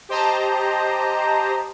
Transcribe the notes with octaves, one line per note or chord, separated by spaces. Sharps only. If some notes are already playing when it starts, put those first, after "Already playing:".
G4 C5 D#5 A5 A#5